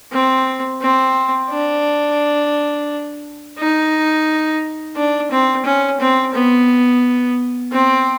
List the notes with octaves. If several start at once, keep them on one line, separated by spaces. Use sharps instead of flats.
C4
C4
D4
D#4
D4
C4
C#4
C4
B3
C4